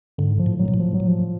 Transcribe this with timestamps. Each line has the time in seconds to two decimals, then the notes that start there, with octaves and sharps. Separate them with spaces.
0.18 G#2 D3
0.39 F3
0.46 A2
0.59 F#3
0.68 B2
0.74 A2
0.79 F3
0.94 F#3
1.00 A2
1.08 F3